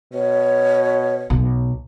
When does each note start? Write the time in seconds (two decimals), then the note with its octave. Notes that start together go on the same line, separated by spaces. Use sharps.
0.13 B2 C#5
1.30 B1